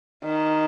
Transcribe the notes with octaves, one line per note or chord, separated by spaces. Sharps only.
D#3